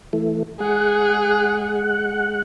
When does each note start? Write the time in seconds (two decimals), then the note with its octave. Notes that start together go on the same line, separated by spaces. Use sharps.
0.13 E3 A3
0.60 G#3 G#4 F#5